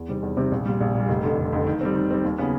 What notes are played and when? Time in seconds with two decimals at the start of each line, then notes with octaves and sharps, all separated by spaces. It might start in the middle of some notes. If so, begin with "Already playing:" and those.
Already playing: E2
0.08 C3 D#3 G3 C4
0.23 E2
0.37 C3 D#3 G3 C4
0.51 A#1
0.66 A#2 G3
0.81 A#1
0.95 A#2
1.00 G3
1.09 F1
1.24 F2 D3
1.38 F1
1.53 F2 D3
1.67 D#3
1.81 G3 C4
1.96 D#3
2.11 G3 C4
2.24 D#2
2.38 C#3 F#3 B3